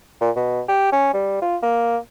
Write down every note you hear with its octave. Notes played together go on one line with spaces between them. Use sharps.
A#2
B2
G4
C#4
G3
F4
A#3